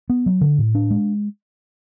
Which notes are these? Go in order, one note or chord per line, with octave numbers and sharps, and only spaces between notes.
B3
F#3
D3
A2
D4
G#3